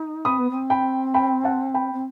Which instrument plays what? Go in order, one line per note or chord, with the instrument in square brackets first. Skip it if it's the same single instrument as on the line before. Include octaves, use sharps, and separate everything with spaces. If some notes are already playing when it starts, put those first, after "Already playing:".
Already playing: [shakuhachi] D#4
[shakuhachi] C4 [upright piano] B5 D#6
[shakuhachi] B3
C4
[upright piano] G5 B5
G5 B5
F#5 A5
G5 B5
[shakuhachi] C4